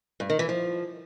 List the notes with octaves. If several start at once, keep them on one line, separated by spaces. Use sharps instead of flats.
G2
D#3
E3
F3